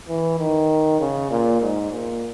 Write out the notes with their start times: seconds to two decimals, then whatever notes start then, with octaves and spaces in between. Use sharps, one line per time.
0.08 E3
0.39 D#3
1.00 C#3
1.31 A#2
1.62 G#2
1.92 A#2